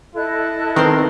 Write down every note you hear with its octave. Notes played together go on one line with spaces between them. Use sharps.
E4 A4 D#5 F#6
D#3 B3 C4 A#4 C5